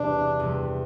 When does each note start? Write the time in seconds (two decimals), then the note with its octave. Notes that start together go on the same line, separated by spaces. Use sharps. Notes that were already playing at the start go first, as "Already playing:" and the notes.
Already playing: E2 C3 G3 D4
0.40 E2 C3 G3